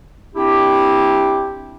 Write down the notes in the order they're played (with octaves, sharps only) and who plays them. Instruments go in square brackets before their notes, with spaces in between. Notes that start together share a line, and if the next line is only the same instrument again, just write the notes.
[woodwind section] C4 D4 E4 G4